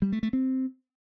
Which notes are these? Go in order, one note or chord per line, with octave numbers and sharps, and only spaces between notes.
G3
A3
A3
C4